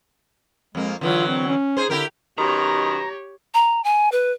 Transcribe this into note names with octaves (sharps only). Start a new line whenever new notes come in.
F2 G#3 A#3
D3 E3 F#3 F4
C4
C#4
D#4 G#4 C5
D3 E4 G4 A#4
F#2 B2 D#3 G4 C#5 A#5
A#5
G#5
B4